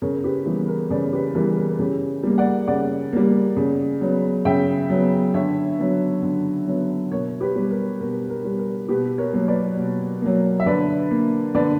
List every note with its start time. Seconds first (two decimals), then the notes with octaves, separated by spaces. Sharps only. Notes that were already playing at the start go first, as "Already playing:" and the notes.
0.02 C#3 A#4 C#5
0.24 G4 B4
0.46 E3 G3 B3
0.68 A#4
0.90 C#3 B4 D5
1.13 G4 B4
1.35 E3 G3 B3 A#4
1.57 A#4
1.79 C#3 G4
2.23 G3 A#3
2.38 D5 F#5
2.68 C#3 D5 F#5
3.13 G3 A#3
3.57 C#3
4.01 F#3 B3
4.45 C#3 E5 G5
4.90 F#3 B3
5.34 D3 C#5 E5
5.78 F#3 B3
6.23 D3
6.67 F#3 B3
7.11 B2 A#4 C#5
7.41 G4 B4
7.56 G3 B3
7.71 A#4
8.00 B2 A#4
8.30 A#4
8.44 G3 B3
8.59 A#4
8.89 B2 G4 B4
9.18 A#4 C#5
9.33 F#3 A#3
9.48 B4 D5
9.77 B2
10.21 F#3 A#3
10.60 E5
10.66 D3 B4 D5
11.11 A#3
11.55 D3 B4 D5